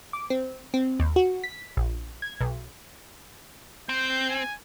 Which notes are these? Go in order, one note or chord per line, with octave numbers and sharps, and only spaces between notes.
D6
C4
C4
D#2
F#4
B6
A#1
G#6
B1
C4 G6
G#5